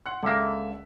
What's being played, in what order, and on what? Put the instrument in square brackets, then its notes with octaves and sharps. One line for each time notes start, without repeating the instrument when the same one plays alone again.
[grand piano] F#5 C6 F#6
[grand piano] C#2 E5 [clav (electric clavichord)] D3 A#3